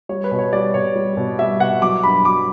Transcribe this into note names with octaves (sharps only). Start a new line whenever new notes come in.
G3 C#5
B4
B2
C#5
G3 D5
B2 C#5
G3
B2
G3 E5
B2 F#5
F#3 D6
G2 B5
F#3 D6